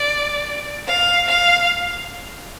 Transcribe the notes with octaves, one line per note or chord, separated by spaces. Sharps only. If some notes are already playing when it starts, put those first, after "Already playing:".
Already playing: D5
F5
F5